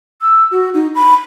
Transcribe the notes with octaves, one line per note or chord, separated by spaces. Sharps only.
E6
F#4
D#4
B5